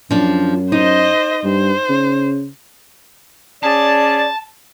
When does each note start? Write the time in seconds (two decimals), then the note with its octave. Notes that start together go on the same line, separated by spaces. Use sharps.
0.11 F#2 F3 D4
0.72 D#4 C5 D#5
1.44 G2 C5
1.89 C#3
3.64 C#4 G#4 D5 A5